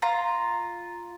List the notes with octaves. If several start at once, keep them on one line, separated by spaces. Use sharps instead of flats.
F4 A#5